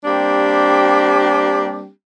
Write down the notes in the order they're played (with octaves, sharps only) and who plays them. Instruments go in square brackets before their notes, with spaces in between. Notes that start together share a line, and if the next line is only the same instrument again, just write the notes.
[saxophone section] G3 A#3 C4 D4 G4